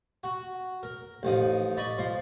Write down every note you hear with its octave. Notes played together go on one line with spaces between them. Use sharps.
F#4
A#4
A1 F3 D#4
D5 D#5 B5 C#6
F3 C6